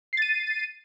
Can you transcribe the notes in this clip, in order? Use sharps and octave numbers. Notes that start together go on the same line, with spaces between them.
A6 C7 D#7